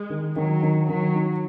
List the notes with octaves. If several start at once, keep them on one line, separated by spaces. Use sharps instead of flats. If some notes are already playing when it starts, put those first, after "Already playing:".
Already playing: G#3
D#3
D#3 F#3
D#3
D#3 F#3
D#4